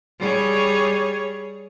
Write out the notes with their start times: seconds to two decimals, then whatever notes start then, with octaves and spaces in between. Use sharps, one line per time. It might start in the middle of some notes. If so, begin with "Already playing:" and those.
0.19 G3 G#4 C#5